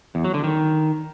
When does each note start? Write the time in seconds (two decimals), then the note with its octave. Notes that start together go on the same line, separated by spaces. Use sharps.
0.15 E2
0.25 F#3
0.34 D3
0.44 D#3